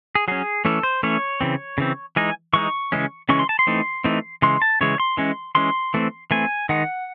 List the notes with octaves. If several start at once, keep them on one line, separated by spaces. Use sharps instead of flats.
G#4
F#3 C#4 G#4
E3 A3 C#4 A4
C5
E3 A3 C#4 C#5
C#3 E3 C4
C#3 E3 C4
E3 G#3 D#4 G#5
E3 G#3 D#4 C#6
C#3 E3 G#3 C#4
C#3 E3 G#3 C#4 C#6
C6
A5
C6
E3 A3 C4 D#4
E3 A3 C4 D#4
C#3 E3 G#3 C6
A5
C#3 E3 G#3 C#5
C6
E3 G#3 C#4
E3 G#3 C#4 C6
E3 A3 C4
E3 A3 C4 G#5
D#3 G#3 D#4 F#5